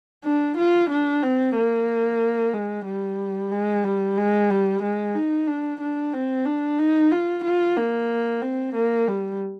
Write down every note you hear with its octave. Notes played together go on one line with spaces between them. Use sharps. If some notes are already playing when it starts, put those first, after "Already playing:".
D4
F4
D4
C4
A#3
G#3
G3
G#3
G3
G#3
G3
G#3
D#4
D4
D4
C4
D4
D#4
F4
F4
A#3
C4
A#3
G3